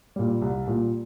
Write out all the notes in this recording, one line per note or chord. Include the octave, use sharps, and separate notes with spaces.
A#2 G3
C2
A#2 G3